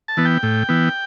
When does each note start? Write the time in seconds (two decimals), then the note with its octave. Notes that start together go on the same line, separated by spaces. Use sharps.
0.08 A5
0.17 E3 B3
0.25 G5
0.43 A2
0.69 E3 B3